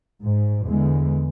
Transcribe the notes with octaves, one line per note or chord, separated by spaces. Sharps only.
G#2
E2 D3 G#3